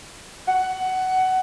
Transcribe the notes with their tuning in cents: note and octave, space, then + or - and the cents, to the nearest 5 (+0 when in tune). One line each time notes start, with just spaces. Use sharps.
F#5 +15